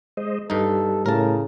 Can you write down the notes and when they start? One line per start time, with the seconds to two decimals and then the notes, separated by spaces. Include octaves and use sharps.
0.17 G#3 C5 D#5
0.50 G2 G3 D#4 A4
1.06 A2 C#3 A#4 A5